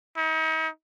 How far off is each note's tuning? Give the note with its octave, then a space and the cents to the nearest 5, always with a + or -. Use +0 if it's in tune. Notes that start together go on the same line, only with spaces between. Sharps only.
D#4 +40